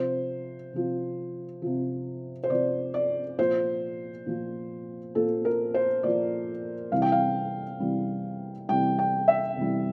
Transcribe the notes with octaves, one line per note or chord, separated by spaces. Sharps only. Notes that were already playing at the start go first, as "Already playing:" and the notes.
Already playing: C3 F3 C5
C3 F3
C3 F3
C5
C3 F3 D5
D5
A#2 F3 C5
A#2 F3
A#2 F3 A4
A#4
C5
A#2 F3 D5
C3 E3 G3 F5
G5
F5
C3 E3 G3
C3 E3 G3 G5
G5
E5
C3 E3 G3